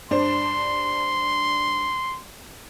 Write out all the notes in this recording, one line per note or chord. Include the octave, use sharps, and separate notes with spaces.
G2 D4 C5 C6